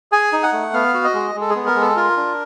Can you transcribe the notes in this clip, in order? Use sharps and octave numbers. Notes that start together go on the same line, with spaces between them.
G#4 G#5
D#4
F#5
A3
B3 F5
F#4
D#5
G#3
G#3
A4
G#4
B3
A#4
G#3
A4
F4 A#4
D4